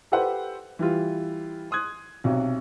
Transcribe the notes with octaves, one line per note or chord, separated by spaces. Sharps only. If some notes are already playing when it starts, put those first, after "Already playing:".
G4 A4 B4 C5 F#5
E3 G3 F4
C6 D#6 F#6 G#6
B1 C3 F#4